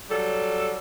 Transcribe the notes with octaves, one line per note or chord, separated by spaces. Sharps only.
F#3 G3 A4